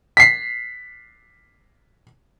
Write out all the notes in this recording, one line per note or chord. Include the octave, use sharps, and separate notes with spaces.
B6 C7